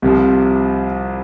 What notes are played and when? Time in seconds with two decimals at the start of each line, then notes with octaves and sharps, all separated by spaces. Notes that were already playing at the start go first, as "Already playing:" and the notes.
0.02 C2 C3 F3